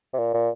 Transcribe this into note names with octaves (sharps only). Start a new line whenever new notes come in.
C3
A#2
A#2